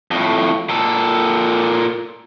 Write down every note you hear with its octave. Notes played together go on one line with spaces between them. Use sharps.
F2 A2
A#2 A4